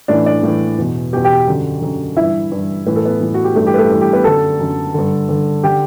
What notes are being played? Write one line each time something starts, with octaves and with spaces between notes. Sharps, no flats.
A2 E3 D4 D5
D4 D5
A2 E3
E2 B2
E2 B2 G4 G5
G4 G5
F#2 D3
F#2 D3
G2 E3 E4 E5
G2 E3
A2 E3 B4
A4
B3 B4
A2 E3
F#4
G4
G2 E3 A3 A4
G4
B4
A3 A4
G2 E3
G4
B3 B4
F#2 D3 A4 A5
F#2 D3
G2 D3
G2 D3
D3 G4 G5